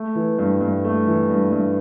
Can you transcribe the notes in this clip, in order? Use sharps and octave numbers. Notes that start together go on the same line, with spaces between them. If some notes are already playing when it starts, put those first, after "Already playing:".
Already playing: A3
E3
G2
G2
A3
E3
G2
G2